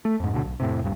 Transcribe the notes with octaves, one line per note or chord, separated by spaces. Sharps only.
A3
F2 G#2
D2 B2 D3
B1
F2 A2 C3
D#1 G2